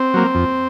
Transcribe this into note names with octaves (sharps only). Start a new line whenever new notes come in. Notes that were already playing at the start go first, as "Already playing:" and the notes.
Already playing: C4
F#3 A#3
F2